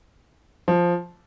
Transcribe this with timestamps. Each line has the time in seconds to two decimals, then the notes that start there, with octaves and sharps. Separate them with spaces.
0.68 F3